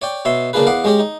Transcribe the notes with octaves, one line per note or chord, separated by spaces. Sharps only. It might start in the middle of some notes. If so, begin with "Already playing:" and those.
C#5 D5 G5
B2 C#5 E5 C6
C#3 A#3 D4 F4 G#4 B4
E2 F5 F#5 D6
G#3 C#4 G4 G#4 C#5
D#4